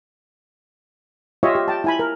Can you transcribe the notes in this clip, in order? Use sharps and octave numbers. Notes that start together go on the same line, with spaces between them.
F4 G4 C#5 D#5 E5
G4
G5 A5
E4 G#5 B5
A#4